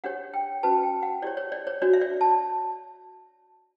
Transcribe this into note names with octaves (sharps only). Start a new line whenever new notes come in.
D4 G4 C#5 F#5
G5
C#4 F#4 B4 A5
G5
F#5
E4 G4 C#5 D5
C#5
D5
C#5
D4 F#4 C#5 D5
E5
D5
A5